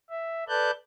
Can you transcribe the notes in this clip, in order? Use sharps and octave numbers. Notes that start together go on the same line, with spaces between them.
E5
A4 B4 D5 A5 F#6 G6